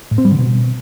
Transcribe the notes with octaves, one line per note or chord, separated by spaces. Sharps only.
A2
C4
G3
D3
B2